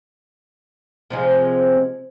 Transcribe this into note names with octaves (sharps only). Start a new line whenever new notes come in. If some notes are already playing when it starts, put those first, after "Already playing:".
C3 F3 G#3